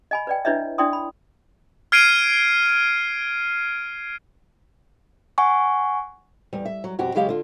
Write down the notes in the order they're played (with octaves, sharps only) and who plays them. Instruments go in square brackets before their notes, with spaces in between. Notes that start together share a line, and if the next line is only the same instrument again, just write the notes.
[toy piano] D#5 G#5 B5
B4 D5 G5
D4 E4 B4 C#5 D#5 E5
D4 E4 D5 G5 C6 D#6
B5
[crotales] F6 G#6 C7 D7 D#7
[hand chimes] F#5 G#5 C#6
[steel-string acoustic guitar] E2 G3
E5
F#3
F2 B2 F#4 G4
C#3 F#3 G#3 G4 F5
D3 F4